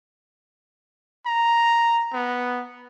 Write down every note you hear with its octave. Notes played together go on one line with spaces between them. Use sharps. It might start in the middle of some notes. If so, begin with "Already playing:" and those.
A#5
B3